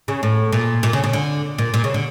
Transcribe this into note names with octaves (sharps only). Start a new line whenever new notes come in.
C#3
A2
A#2
A#2
C#3
C#3
D3
A#2
A#2
C#3
D3